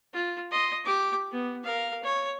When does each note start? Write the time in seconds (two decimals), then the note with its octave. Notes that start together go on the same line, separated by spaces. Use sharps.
0.13 F4
0.51 D#5 C6
0.85 G4 D6
1.31 B3
1.64 A#4 F5
2.03 C#5